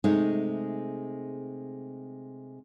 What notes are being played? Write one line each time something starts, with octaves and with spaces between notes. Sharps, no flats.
C3 G#3 A3 D#4 G#4